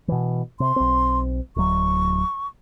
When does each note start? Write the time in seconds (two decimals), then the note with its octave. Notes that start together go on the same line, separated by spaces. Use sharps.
0.08 B2 E3
0.60 C3 C6
0.76 B1 C4
1.56 D1 F#3 C#6